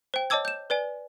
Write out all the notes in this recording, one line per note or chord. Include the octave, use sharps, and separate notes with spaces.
C5 G5
C#5 D#5 A5 D6 E6 G#6
G6 E7
B4 D5 G#5